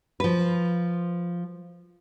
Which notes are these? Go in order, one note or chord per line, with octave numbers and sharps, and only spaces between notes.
F3 B4